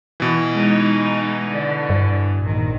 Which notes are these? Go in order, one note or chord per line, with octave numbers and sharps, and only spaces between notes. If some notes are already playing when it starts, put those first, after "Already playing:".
B2 E3
G#3 D#4
D3
G2
A#1 D#3